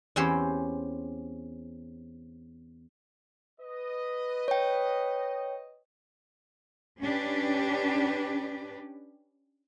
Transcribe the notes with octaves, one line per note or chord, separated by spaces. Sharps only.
E2 C4 C#4 G4 C5 C6
B4 D#5
C#5 G5
C#4 D4 G4 B4